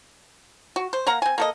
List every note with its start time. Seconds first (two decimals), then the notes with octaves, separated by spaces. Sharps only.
0.76 F#4
0.93 C5
1.07 A#3 F5 F#5 A#5
1.22 C4 G#5
1.38 A#3 A4 D#5